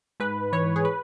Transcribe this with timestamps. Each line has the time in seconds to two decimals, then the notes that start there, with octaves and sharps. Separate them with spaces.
0.20 G#2 B4
0.53 E3 C#5
0.76 G#4
0.85 B4